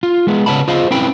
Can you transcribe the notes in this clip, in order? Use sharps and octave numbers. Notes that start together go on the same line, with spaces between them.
F4
G#3 B3 G#4
C#3 B4 C#5 F#5 A5 B5
F4 G#4 C5 D#5 F5
C4 C#4 E4 B4 G5 B5